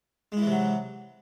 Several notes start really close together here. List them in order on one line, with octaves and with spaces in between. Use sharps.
G#3 E4 E3 C3 F#3